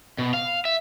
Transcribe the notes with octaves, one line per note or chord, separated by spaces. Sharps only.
B2
F5
E5